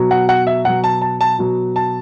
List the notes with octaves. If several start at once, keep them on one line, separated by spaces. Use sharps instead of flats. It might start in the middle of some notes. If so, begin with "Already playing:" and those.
Already playing: B2 F#3
F#5
F#5
E5
B2 F#3 F#5
A5
A5
A5
B2 F#3
A5